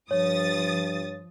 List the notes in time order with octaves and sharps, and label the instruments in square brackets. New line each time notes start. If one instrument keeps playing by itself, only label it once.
[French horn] G2 [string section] F3 D#6 A6 [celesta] C#5